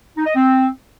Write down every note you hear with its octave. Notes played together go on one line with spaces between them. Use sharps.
D#4
D#5
C4